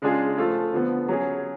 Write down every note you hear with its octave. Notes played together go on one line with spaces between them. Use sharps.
C#3 G#3 D4 F4 G#4
F3 A3 F4 A4
D3 F3 B3
F#3 C#4 G#4